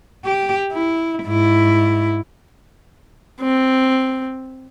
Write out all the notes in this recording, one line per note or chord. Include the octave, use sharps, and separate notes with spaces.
G4
E4
G#2 E4
C4